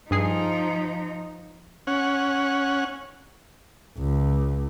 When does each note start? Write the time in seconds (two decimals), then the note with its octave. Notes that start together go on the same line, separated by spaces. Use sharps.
0.11 G2 F3 D#4 G#4 C7
1.87 C#4 F#5
3.99 C#2